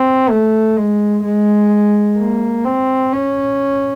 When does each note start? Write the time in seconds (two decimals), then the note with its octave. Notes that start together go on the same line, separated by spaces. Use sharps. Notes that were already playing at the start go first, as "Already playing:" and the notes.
Already playing: C4
0.29 A3
0.77 G#3
1.24 G#3
2.18 A#3
2.65 C4
3.13 C#4